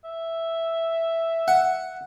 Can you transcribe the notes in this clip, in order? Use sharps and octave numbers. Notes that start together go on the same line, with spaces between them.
E5
F#5